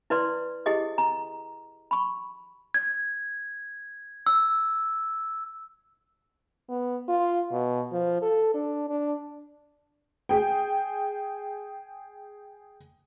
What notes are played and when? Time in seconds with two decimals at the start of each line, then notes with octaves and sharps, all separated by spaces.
0.10 E4 B4 D5 C6
0.66 E4 G4 G#4 D#5 D#6
0.98 A#5
1.91 B5 C#6
2.74 G#6
4.27 E6
6.69 B3
7.09 F4
7.52 B2
7.92 F3
8.22 A4
8.54 D4
8.89 D4
10.29 G#4 G5